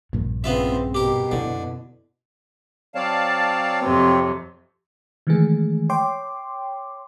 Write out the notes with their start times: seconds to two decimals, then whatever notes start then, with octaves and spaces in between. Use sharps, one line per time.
0.13 A#1 G2 A#2
0.44 C#3 B3 C4 F4 E5
0.95 B2 G4 A#4
1.31 F#2 D3 E4
2.95 F#3 C4 C#5 D5 F5 A5
3.82 F2 C3
5.27 D#3 E3 G#3 A3 G#4
5.89 C#5 G5 C6 D6